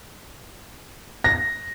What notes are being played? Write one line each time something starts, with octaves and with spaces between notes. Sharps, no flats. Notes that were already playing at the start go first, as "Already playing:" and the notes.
A#6